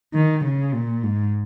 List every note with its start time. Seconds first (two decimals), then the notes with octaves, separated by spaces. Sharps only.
0.14 D#3
0.44 C#3
0.74 A#2
1.03 G#2